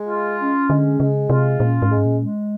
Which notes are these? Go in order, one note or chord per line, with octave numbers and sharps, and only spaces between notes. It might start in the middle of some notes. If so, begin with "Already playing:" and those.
Already playing: G#3
F4
C#4
D3 G#3
C#3 G#3
C3 F4
A#2 C#4
G#2
A2 G#3
G#2
A#2
G#3